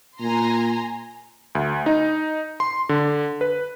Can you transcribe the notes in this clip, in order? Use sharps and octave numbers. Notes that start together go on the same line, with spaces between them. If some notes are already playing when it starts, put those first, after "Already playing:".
A#2 G#5 A#5 C6
D2
D#4
C6
D3
B4